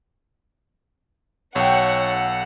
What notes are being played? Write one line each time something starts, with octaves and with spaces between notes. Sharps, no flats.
B1 A4 C#5 F#5 G5